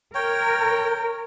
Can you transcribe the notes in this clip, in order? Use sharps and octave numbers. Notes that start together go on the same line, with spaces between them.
A#4 C#5 G5